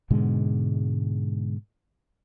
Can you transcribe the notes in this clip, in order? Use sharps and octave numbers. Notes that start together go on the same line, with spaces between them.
G#2 B2 D3 G#3